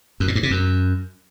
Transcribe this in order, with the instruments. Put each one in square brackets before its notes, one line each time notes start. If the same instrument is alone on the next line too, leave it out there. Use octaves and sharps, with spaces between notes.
[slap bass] F#2
A#2
G2
C3
F#2